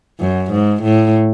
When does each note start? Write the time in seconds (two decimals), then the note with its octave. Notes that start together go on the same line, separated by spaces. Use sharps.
0.20 F#2
0.51 G#2
0.83 A2